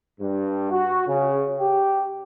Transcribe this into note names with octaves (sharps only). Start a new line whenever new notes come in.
G2
F#4
C#3
G4